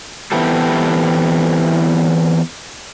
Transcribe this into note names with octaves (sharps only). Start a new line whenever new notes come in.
E3 B3 C4 E4 G4 A4